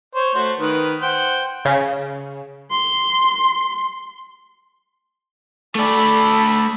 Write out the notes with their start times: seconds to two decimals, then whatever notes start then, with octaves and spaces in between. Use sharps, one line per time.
0.15 C5 C#5
0.35 A3 F#4 C5
0.59 D#3 B4
1.02 C5 F#5 G5
1.65 C#3
2.71 C6
5.75 A3 A4 D5 B5